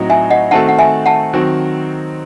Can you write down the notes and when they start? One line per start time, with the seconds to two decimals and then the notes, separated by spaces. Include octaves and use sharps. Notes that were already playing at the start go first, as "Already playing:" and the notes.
Already playing: A2 F#3 C4 D#4 F#4
0.10 E5 G#5
0.30 D#5 F#5
0.51 D#3 A3 C4 F#4 A4 F#5 A5
0.68 F#5
0.78 E5 G#5
1.06 F#5 A5
1.33 D#3 F#3 C4 F#4